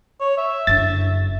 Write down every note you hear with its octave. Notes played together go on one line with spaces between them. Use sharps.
C#5
E5
F#1 D3 A6